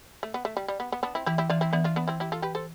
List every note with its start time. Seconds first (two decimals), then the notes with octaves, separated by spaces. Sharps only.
0.23 A3
0.34 B3
0.45 A3
0.57 G3
0.68 G3
0.80 B3
0.92 B3
1.03 B3 D4
1.15 C4 E4
1.26 E3 E4 G4
1.38 E4 G4
1.50 E3 D4 F4
1.61 C4 E4
1.73 E3 B3 D4
1.84 D4 F4
1.96 B3 D4
2.08 C4 E4
2.20 E4 G4
2.32 F4 A4
2.42 G4 B4
2.55 A4 C5